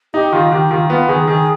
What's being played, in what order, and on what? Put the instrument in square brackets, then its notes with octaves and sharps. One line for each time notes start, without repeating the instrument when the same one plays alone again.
[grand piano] D#4 [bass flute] G4
[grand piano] D#3 [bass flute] F4
[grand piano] D#3 [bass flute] G4
[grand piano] D#3 [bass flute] F4
[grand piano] B3 [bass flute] F4
[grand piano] D#3 [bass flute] G#4
[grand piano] D#3 [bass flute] G#4